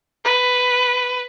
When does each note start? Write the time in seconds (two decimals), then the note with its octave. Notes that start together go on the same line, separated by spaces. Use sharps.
0.24 B4